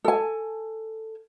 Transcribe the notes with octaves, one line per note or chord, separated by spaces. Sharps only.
A4 G#5